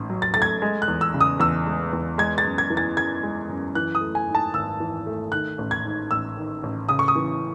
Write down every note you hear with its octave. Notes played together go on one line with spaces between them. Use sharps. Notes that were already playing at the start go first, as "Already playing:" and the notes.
Already playing: A1 G#2
F#3
A6
A3 A6
G#6
G#3
F#6
E2
E6
C#3
D#6
E2 E6
G#3
E2
G#3 G#6
A6
F#2
G#6
E3
A6
F#2 G#6
G#3
F#2
E3 F#6
D#6
A3
G#5
G#2
A5
G#1 E6
E3
A3
D#3 F#6
A1
G#6
G#2
A1 E6
D#3
A1
C#3 D#6
C#6
D#6
E3